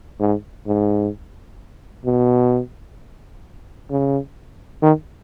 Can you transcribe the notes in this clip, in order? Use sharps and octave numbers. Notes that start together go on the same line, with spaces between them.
G#2
G#2
B2
C#3
D#3